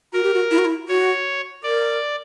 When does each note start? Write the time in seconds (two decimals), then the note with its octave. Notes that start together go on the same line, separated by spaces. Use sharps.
0.13 F#4 A#4
0.23 G4
0.34 F#4
0.51 E4
0.58 F#4
0.65 E4
0.88 F#4 C#5
1.63 A#4 D5